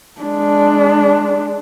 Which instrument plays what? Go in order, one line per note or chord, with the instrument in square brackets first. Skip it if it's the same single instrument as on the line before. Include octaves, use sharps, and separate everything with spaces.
[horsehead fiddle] G#3 D4